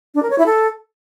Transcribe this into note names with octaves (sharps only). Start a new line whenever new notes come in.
D4
A#4
C#5
E4
A4